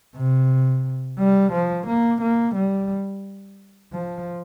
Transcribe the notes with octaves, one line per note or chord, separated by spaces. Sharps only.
C3
G3
F3
A#3
A#3
G3
F3